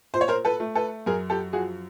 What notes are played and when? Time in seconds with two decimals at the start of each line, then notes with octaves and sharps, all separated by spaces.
0.14 A#2 C5
0.21 C#5
0.28 A#4 C5
0.45 A4 B4
0.60 A3
0.75 A4 B4
1.06 F#2 G#4 A#4
1.30 G4 A4
1.53 F3 F#4 G#4